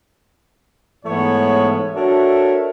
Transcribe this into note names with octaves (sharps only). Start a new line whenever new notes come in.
G#2 E3 A3 B3 C#5
D4 F#4 A4 A#4 C#5 E5